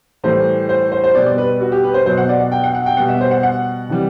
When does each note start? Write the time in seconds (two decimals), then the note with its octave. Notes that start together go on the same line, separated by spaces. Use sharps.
0.24 A2 E3 G3 C5
0.69 C5
0.92 C5
1.04 C5
1.15 B2 G3 D5
1.26 D5
1.38 B4
1.61 F#4
1.72 G4
1.83 B4
1.94 C5
2.06 B2 F#3 C5
2.18 F#5
2.29 D5
2.40 F#5
2.52 G5
2.64 F#5
2.75 F#5
2.86 G5
2.97 B2 G3 F#5
3.09 E5
3.21 C5
3.31 F#5
3.43 F#5
3.89 C3 E3 G3